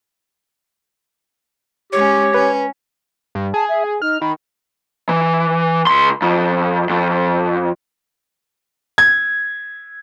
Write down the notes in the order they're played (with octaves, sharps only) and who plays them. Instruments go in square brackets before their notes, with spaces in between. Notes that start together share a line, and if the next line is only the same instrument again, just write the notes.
[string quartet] G#3 C#4 [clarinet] G4 [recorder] C#5
[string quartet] C#4 [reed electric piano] B4
[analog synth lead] G2
[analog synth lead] G#4 [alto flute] A5
[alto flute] E5
G#5
[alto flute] D#4 [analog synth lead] F6
[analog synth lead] D#3 [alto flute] B5
[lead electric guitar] E3
C#2 C6
F2
F2
[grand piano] G#6